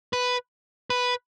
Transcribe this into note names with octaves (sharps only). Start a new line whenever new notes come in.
B4
B4